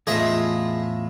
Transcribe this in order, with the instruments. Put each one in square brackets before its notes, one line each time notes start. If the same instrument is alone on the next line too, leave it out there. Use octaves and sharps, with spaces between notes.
[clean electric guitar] E2 A2 A3 [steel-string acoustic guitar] F4 [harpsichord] G#4 D#5 E5